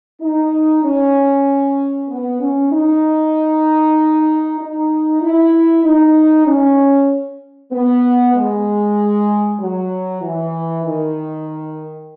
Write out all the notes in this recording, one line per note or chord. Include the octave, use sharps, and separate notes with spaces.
D#4
C#4
B3
C#4
D#4
D#4
E4
D#4
C#4
B3
G#3
F#3
E3
D#3